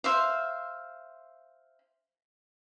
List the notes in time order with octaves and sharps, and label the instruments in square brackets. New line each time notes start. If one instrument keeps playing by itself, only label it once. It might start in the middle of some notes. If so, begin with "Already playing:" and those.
[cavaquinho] C5 E5 F5